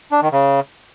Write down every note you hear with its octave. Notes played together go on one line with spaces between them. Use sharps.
D4
D#3
C#3